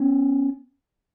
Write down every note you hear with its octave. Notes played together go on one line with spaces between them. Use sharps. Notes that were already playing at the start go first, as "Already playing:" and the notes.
Already playing: B3 C#4